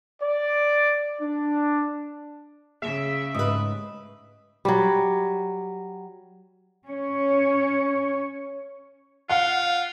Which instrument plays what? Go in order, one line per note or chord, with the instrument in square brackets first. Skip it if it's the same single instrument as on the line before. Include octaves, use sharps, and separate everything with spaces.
[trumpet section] D5
D4
[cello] C#3 [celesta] G#4 [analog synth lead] E5
[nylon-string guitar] G#2 B4 [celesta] D#6
[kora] F#3 G3
[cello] C#4 C#5
[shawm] F4 [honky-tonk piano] F5 F#5